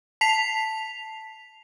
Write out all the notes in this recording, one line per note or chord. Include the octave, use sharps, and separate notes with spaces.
A5 B6 C7 F7